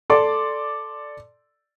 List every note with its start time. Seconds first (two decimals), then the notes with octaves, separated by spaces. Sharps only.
0.10 A4 D5 C6 D6